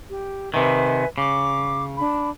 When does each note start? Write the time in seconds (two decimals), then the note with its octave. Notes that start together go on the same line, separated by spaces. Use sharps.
0.09 G4
0.54 C3 D#3 B4 E5 G#5
1.18 C#3 D6
1.96 D4 B5